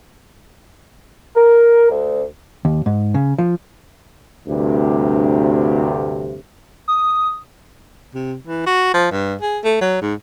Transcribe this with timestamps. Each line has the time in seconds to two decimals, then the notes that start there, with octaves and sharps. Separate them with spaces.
1.36 A#4
1.90 D2
2.65 D#2
2.86 G#2
3.14 C#3
3.38 F3
4.47 D2 G2 C3
6.88 D#6
8.14 C3
8.47 E3
8.66 F#4
8.94 F3
9.11 G2
9.41 G#4
9.64 A3
9.81 F#3
10.02 G#2